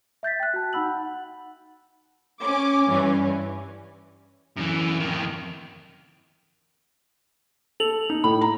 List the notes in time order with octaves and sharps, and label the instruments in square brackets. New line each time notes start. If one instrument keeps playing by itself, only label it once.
[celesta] E5 G6 A6 B6
G5 F#6
F#4 A5
D#4 F#5 B5 E6 F#7
F#5
[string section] C#4 D6
G2 E3 C#4
[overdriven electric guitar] F#2 E3
F2 D#3
[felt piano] A4 [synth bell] F7 F#7
[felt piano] D#4
[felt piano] A2 [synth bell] B5
[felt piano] A#5